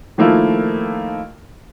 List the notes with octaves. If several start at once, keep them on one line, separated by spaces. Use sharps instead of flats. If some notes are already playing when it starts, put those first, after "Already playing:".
D#3 F3 A3 A#3 E4